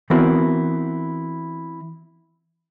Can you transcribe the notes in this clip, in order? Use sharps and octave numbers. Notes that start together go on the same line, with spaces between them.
E3 B3 C4 E4 F#4 A#4